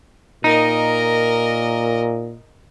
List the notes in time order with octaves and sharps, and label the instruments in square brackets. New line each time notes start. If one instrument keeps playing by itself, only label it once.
[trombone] A#2 [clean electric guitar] D#4 [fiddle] A#4 D#5